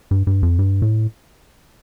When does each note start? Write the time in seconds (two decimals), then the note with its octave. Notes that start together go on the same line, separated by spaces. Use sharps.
0.11 G2
0.27 G2
0.43 F2
0.59 G2
0.82 A2